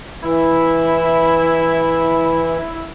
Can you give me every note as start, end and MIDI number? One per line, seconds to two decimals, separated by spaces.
0.23 2.57 52
0.23 2.89 64